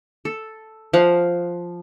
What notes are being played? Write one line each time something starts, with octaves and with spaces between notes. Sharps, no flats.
A4
F3 F5 F#5